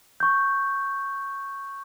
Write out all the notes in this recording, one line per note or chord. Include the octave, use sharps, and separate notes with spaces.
C#6 G6